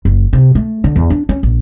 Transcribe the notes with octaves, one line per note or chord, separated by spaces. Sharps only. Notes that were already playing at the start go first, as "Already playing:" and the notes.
F#1
C3
A3
D3
E2
D4
C#4
A#1